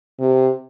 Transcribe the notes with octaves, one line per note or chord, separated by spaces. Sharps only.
C3